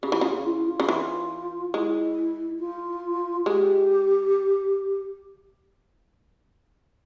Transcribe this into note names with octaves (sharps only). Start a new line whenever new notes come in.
C#3 G4
E3
C#3 F4
E4
F4
C#3
E3 F4
G#3 E4
F4
G#3 G4